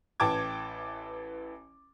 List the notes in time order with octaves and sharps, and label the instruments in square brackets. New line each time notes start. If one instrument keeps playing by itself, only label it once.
[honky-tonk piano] A1 E3 G5 A5 D6 G#6